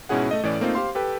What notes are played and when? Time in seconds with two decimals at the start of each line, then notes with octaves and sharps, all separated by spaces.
0.09 G#2 B2 C#4 E4 G#4 F#5
0.31 A3 D#5
0.43 A2 E3 C#4 D5
0.60 A3 A#3 C4 D#4 F4
0.75 G4 C5 F5 C6
0.95 G4 A4 B4 G5